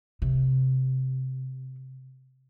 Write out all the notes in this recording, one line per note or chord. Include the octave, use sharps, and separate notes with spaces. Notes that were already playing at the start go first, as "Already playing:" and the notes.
C3